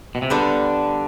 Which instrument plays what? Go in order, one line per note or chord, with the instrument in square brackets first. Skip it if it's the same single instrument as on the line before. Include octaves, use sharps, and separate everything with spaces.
[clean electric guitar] B2
C3
[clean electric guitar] D3 [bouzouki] G3 B3 D4 A4